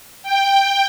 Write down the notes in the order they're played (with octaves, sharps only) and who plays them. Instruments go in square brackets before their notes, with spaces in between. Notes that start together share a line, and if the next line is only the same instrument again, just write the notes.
[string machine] G5